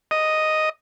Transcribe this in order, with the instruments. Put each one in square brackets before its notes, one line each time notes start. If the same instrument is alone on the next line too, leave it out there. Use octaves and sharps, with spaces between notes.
[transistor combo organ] D#5